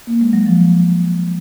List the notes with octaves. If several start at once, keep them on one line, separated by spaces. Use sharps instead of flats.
A#3
G#3
F#3
F3